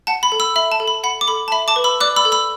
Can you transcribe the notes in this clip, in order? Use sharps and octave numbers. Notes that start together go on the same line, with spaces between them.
F#5 A5
B5
A4
B5 E6
E5 B5
A5
A4
B5
F#5 B5
D6
A4 B5
A5
E5 B5
A5 D6
B4
B5 E6
D5 D6 F#6
B5 E6
A4
B5 E6